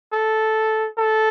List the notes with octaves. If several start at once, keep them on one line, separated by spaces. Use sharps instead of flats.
A4
A4